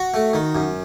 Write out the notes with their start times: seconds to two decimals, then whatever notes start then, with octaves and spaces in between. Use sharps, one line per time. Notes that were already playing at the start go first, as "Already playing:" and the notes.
Already playing: F#4
0.14 A3
0.34 D#3
0.55 F#2